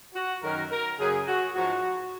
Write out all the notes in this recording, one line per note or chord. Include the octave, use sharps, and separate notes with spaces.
F#4
F#2 D#3 F#3 A#4
A#4
F#2 C#3 F#3 G#4
F#4
G#2 F3 G#3 F#4